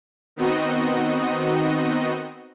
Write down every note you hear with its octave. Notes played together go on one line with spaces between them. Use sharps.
D#3 B3 C4 D#4 F#4 D#5